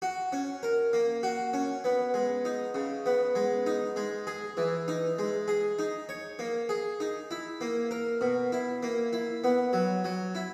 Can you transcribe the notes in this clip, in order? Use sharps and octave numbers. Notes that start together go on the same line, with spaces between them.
F#4
C#4
A#4
A#3
F#4
C#4
B3
G#3
D#4
C#3
B3
G#3
D#4
G#3
G#4
E3
D#4
G#3
G#4
D#4
C#5
A#3
G#4
D#4
E4
A#3
A#4
B2
E4
A#3
E4
B3
F#3
F#3
E4